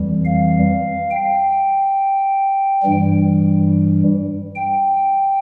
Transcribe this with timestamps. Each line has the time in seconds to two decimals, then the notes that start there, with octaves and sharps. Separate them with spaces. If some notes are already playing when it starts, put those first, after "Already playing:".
Already playing: F2 E3 G3
0.25 F5
1.11 G5
2.83 G2 E3 G3
4.55 G5